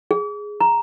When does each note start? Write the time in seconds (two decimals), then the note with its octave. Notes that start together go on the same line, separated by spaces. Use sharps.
0.11 G#4
0.61 A#5